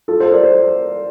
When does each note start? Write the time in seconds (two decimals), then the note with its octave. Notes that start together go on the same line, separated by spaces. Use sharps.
0.08 F4 A4
0.20 A4 C5
0.32 A#4 D5
0.44 A4 C5